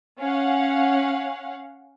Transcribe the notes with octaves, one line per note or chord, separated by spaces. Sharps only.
C#4 F5 F#5